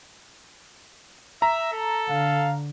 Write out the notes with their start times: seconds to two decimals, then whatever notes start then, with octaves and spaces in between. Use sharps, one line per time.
1.42 E5 A#5
1.73 A4
2.09 D3 F5